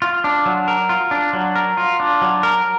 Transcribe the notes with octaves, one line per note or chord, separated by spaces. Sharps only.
F4
D4
F#3
A#4
F4
D4
F#3
A#4
F4
D4
F#3
A#4